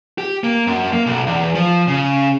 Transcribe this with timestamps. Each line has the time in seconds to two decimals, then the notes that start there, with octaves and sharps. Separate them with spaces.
0.18 G4
0.44 A#3
0.67 F#2
0.92 A#3
1.06 B1
1.27 E2
1.55 F3
1.88 C#3